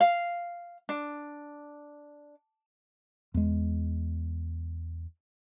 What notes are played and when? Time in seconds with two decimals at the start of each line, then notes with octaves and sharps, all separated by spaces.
0.01 F5
0.89 D4
3.34 E2 G#3